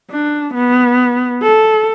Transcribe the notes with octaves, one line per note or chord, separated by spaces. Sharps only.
D4
B3
A4